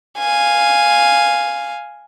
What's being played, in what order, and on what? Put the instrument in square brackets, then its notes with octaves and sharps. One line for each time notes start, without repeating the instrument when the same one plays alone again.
[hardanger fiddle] F5 G#5